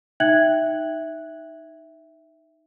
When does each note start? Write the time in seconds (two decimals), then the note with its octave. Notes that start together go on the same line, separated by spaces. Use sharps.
0.20 D#4 E5 G5 F#6 G#6 F#7